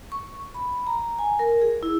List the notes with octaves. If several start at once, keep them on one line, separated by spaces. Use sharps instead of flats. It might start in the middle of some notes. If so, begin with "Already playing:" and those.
C#6
B5
A#5
G#5
A#4
G#4
E4